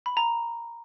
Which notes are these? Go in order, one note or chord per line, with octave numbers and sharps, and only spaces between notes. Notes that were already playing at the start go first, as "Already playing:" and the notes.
B5
A#5